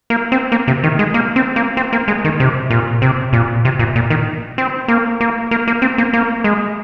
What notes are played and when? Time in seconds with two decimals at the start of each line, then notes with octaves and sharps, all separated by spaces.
0.10 A#3
0.32 C4
0.52 A#3
0.67 C3
0.83 D#3
0.99 G#3
1.14 A#3
1.36 C4
1.56 A#3
1.77 C4
1.93 A#3
2.08 G#3
2.25 D#3
2.40 C3
2.71 A#2
3.02 C3
3.33 A#2
3.65 C3
3.79 A#2
3.95 A#2
4.10 D#3
4.58 C4
4.88 A#3
5.21 A#3
5.51 A#3
5.68 A#3
5.82 C4
5.98 A#3
6.13 A#3
6.44 G#3